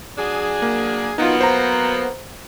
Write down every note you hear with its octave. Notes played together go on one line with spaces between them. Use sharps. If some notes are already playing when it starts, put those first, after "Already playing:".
F#3 D4 G#4
A#3
F#3 A#3 B3 D#4 F4
C5 A#5